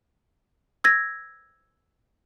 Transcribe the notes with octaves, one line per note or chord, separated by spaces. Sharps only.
E6 G#6 A#6